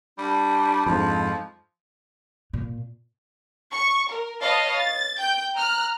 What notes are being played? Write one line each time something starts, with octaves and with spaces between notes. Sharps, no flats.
G3 D4
F2 G#2 F3
A#2
C#6
A#4
B4 C#5 D#5 F5 A5
A6
G5 G6
A#5 F6 F#6